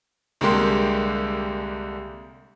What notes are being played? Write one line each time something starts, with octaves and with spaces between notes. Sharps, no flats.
C2 D3 G#3 A#3 G4 C6